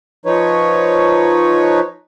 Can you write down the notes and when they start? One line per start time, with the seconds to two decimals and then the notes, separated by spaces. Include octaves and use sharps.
0.26 F3 D#4 B4 C#5